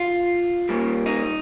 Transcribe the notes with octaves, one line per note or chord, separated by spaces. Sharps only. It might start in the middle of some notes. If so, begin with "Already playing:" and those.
Already playing: F4
A#2 G3 A#3
D#4